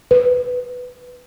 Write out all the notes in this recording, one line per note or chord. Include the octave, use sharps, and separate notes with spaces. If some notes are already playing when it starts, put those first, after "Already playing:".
B4